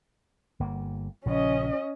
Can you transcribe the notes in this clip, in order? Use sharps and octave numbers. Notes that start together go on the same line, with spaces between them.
G1 A#3
A#1 C#3 F3 C#4 D#5